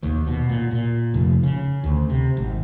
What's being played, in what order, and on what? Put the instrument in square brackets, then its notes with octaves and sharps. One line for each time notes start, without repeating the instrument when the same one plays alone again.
[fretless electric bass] D#2
B2
A#2
A#2
F1
C#3
D2
C3
G#1